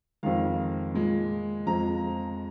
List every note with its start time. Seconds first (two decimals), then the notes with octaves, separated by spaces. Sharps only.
0.23 F2 D#3 G#3 F5
0.94 A#2 G#3
1.67 F2 F3 G#3 A#5